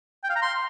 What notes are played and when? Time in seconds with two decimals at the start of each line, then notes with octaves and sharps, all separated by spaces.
0.24 G5
0.30 F5
0.36 A#5
0.42 C6